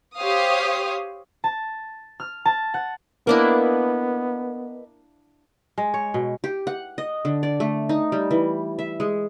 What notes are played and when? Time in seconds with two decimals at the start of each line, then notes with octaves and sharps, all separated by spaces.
0.16 G4 C5 C#5 F5 D#6
1.44 A5
2.20 F6
2.45 A5
2.74 F#5
3.27 A#3 B3 D4 E4 A#4 B4 D#5
5.78 G#3
5.94 C#5
6.14 B2
6.44 G4
6.67 F#5
6.98 D#5
7.25 D3
7.43 D5
7.60 A3
7.89 D#4
8.12 G3
8.31 E3
8.79 E5
9.00 G#3